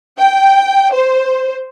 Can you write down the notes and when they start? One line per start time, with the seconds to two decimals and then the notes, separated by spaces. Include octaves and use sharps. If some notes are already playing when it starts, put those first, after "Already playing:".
0.18 G5
0.92 C5